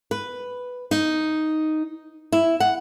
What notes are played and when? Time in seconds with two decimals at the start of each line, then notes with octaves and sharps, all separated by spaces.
0.11 B4
0.91 D#4
2.32 E4
2.60 F#5